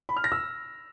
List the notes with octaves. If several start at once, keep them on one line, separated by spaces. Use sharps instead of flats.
B5
F6
A#6
E6